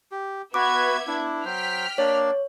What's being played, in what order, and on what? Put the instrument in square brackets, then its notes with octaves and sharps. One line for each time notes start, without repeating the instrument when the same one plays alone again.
[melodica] G4
[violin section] B3 E5 G#6 [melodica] F#4 B4 [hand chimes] D6
[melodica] D4 E4
[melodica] F#3 C5 [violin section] G5 F6 B6
[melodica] A#3 D4 D5 [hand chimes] C#5